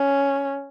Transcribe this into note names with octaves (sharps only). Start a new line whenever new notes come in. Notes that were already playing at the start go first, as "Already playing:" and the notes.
Already playing: C#4